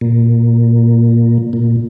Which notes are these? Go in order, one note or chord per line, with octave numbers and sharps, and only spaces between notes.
A#2
A#2